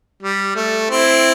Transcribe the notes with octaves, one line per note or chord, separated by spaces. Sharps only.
G3
A3
C4 E4